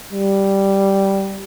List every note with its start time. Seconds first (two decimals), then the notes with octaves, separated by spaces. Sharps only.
0.13 G3